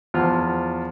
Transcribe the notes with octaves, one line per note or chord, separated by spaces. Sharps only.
E2 F3 F4 F6